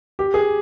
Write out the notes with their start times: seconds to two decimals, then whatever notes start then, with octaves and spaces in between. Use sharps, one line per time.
0.19 G4
0.34 G#4